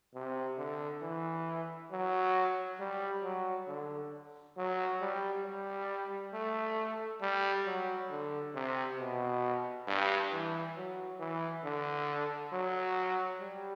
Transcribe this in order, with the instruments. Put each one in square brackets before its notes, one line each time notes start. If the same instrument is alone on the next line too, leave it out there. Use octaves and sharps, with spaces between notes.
[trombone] C3
D3
E3
F#3
G3
F#3
D3
F#3
G3
G3
A3
G3
F#3
D3
C3
B2
G2
E3
F#3
E3
D3
F#3
G3